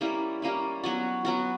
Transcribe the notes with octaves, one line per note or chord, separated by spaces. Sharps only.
G3 A#3 C#4 E4
G3 A#3 C#4 E4
F#3 B3 F#4
F#3 B3 F#4